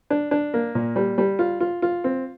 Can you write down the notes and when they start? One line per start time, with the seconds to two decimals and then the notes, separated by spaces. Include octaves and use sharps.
0.10 D4
0.31 D4
0.54 A#3
0.75 A#2
0.96 G3
1.18 G3
1.39 F4
1.60 F4
1.82 F4
2.04 C4